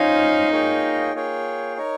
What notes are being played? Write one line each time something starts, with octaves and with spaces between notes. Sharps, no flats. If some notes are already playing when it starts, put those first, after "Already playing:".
Already playing: C#4 D#4 F4 C5 F5 G#5
A#3 F4 G#4 C#5 G5
A#3 F4 G#4 C#5 G5
D#4 A#4 C#5